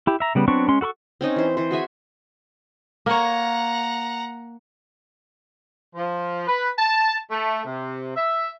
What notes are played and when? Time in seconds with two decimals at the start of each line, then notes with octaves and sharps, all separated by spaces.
0.07 E4 G4
0.20 E5 A#5
0.35 C#3 G3 B3
0.48 F#3 B3 C4 D4 C#6
0.68 G#3 C#4 C6
0.81 F#4 A4 B5 C#6
1.21 C4 C#4 D#4
1.36 E3 C5
1.57 E3 C5
1.71 F#4 G#4 E5 G#5
3.06 A#3 C#5 F#5 A#5
5.95 F3
6.47 B4
6.78 A5
7.31 A3
7.65 C3
8.16 E5